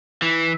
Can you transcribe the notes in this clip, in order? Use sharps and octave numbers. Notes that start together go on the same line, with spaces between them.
E3